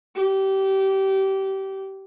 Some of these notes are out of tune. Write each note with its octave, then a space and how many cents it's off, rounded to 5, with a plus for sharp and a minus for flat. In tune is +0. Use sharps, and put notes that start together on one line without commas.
G4 -25